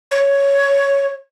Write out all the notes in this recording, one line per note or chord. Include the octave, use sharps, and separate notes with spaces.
C#5